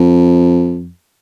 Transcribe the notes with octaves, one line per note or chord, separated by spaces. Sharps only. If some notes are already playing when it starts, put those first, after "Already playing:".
Already playing: F2